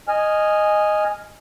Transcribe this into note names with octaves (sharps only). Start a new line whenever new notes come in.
D#5 G#5 F6